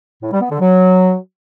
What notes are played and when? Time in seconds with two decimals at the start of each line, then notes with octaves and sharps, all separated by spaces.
0.22 A2
0.32 G3
0.41 B3
0.51 D3
0.60 F#3